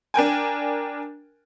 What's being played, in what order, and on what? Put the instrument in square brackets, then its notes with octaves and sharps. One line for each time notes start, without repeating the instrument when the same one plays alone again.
[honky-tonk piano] D4 A#4 G5 G#5